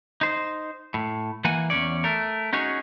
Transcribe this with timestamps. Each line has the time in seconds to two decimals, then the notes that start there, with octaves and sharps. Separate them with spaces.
0.21 D#4 C5
0.94 A2
1.44 E3 A#3 F#5 G#5
1.70 E2 G2 C#4 C#5 D5
2.04 A3 A#4
2.53 C#4 D#4 F#4 G#4 C#5